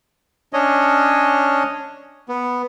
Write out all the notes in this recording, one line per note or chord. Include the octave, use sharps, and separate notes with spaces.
C#4 D4 C#5 D#5
B3